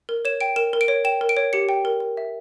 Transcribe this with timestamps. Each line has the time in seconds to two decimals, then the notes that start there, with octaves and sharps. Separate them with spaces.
0.09 A#4
0.25 C#5 E7
0.41 G5 D7
0.56 A#4 E7
0.73 A#4
0.81 D7
0.88 C#5
1.05 G5 E7
1.21 A#4
1.29 D7
1.37 C#5
1.53 G4 C#7
1.69 G5
1.85 A#4
2.00 A#4
2.17 E5